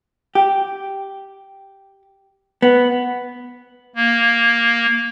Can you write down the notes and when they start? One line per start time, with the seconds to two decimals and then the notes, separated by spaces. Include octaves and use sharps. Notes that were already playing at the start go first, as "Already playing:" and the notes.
0.35 G4
2.62 B3
3.96 A#3